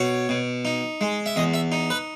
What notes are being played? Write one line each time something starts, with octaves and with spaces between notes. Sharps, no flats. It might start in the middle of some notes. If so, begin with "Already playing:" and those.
Already playing: B2 C#5
B2
D#4
G#3
E5
E2 D#5
E5
D#4
B4